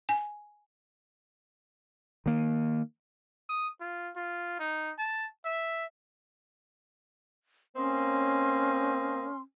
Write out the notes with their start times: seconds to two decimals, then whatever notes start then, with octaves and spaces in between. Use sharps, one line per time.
0.09 G#5
2.26 D#3 A#3
3.49 D#6
3.81 F4
4.16 F4
4.60 D#4
4.99 A5
5.45 E5
7.76 A#3 C4 C#4 D#5 C6